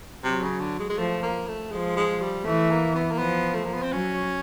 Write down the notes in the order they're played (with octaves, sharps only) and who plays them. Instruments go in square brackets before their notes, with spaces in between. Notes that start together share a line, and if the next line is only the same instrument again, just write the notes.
[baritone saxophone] C3 [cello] F#3
[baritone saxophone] C#3
D3
G#3
G#3
[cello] F3 [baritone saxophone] A3
[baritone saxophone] A#3
A3
[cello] F3 [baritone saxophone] G#3
[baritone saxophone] G#3
G3
[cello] E3 [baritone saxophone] A3
[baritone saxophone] A#3
B3
A#3
[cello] F3 [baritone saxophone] B3
[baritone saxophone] A3
A#3
B3
C4
[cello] F#3 [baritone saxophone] C#4